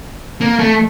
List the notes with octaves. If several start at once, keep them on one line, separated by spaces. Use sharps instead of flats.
A#3
A3